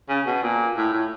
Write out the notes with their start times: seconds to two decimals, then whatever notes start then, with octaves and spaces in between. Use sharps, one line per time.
0.09 C#3
0.26 B2
0.43 A#2
0.76 A2
0.93 A2